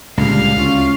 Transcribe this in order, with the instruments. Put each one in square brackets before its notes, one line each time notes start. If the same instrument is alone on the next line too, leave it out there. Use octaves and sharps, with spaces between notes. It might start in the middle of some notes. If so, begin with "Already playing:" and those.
[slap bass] C#2 [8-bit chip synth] A#2 D3 G3 [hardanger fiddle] F5
[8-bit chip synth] D2 F4 [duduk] C#4